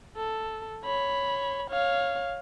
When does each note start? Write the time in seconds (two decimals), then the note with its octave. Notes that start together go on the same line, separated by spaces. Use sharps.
0.17 A4
0.85 C#5 B5
1.70 C#5 F5